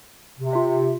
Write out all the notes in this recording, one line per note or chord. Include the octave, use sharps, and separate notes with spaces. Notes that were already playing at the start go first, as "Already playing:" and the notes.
C3
F4 E5